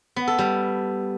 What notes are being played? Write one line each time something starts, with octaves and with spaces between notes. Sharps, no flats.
B3
A4
G3